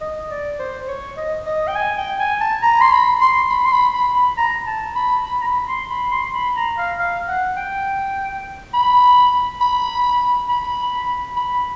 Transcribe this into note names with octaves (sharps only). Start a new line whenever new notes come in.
D#5
D5
C5
C#5
D#5
D#5
G5
G#5
G5
G#5
A5
A#5
C6
B5
C6
B5
C6
B5
B5
B5
A#5
A5
B5
B5
A#5
B5
C6
B5
C6
B5
A#5
F5
F5
F#5
G5
B5
B5
B5
B5